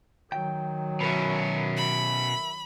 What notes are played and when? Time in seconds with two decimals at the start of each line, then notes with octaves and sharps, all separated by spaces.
0.32 D#3 F#3 G5
1.00 B2 C#4 E4 A#4 B4
1.77 B5